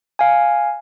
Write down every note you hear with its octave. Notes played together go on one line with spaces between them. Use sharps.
F5 G#5